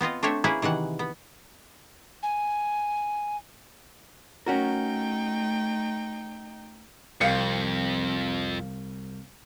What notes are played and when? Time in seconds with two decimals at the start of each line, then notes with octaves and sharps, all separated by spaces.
0.01 B3 C4 F4 D#5
0.23 A3 C4 D4 C5 C#5 E5
0.44 A#3 C#4 E4 G#4 B4
0.62 C3 D#3 E3 F#5
0.99 B3
2.23 G#5
4.46 A3 C#4 D#4 F#4 A#4 G5
7.21 C2 F2 F5 G5 C#7